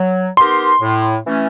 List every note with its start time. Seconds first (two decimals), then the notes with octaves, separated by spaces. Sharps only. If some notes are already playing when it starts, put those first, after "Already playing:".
Already playing: F#3
0.37 B3 D#4 G4 A#4 C6
0.81 A2
1.25 E3 A3 C#4